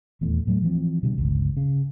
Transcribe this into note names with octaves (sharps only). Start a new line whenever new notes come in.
D#1 E2 A3
A2 F#3 G3 A3
E3 F3 C4
B2 D3 G3
G1 C#2
C#3